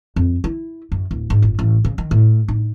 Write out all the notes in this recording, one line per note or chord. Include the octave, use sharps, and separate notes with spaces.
F2
E4
F#2
D1
G#2
G1
A1
C#3
D#3
A2
D#4